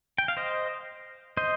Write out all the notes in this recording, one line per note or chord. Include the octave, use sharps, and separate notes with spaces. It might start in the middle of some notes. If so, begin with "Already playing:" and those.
G5
F5
C5 D#5
C5 D#5